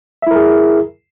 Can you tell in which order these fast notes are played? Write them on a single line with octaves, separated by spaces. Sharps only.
E5 E4 A#4 G#4